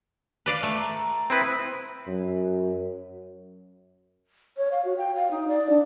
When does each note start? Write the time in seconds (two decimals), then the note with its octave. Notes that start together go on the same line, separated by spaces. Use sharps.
0.46 B4 D5 F5
0.63 A3
0.78 A#5
1.30 C4 E4 B4 D#6
2.07 F#2
4.57 C#5
4.72 F5
4.85 F#4
4.97 G5
5.15 F5
5.31 D#4
5.48 D5
5.70 D4